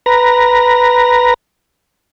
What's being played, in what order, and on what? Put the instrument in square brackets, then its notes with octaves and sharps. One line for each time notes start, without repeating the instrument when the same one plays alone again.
[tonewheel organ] B4 A#5